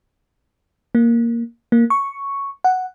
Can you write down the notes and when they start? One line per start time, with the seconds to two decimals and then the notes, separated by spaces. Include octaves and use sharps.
0.95 A#3
1.72 A#3
1.90 C#6
2.64 F#5